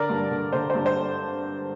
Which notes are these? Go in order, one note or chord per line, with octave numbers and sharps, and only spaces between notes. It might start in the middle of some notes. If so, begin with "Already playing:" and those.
Already playing: D3 A#4 D5
G2
D3
D3 C5
G2 C5
C5